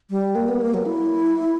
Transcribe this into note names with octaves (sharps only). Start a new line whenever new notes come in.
G3
A#3
B3
A#3
F#3
E4